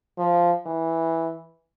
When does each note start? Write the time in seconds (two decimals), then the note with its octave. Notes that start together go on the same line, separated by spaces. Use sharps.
0.18 F3
0.66 E3